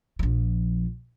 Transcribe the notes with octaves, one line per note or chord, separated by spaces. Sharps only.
A#1 F3